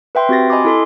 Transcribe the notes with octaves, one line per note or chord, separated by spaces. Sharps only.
B4 E5 G5 C6
C4 F#4 G4 A6 A#6
D#5 G#5 B5 C6 D6
E4 A4 C6